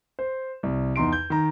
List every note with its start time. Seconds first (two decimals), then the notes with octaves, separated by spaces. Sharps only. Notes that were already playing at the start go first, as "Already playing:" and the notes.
0.19 C5
0.63 C2
0.96 E2 D#4 C6 D7
1.13 G6
1.30 D#3 A#5